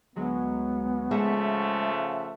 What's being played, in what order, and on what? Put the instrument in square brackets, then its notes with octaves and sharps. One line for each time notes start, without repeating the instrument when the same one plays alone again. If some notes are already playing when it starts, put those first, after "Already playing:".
[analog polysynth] D2 F#3 G#3 [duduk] B3
[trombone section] C#3 F3 A3 [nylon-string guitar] G#3 [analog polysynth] E5 F#5